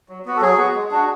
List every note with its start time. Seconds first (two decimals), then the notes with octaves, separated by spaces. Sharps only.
0.09 F#3
0.25 B3 F#4
0.36 A4
0.41 F#3 G#4
0.58 B3 F#4
0.75 G#3
0.91 D4 F#4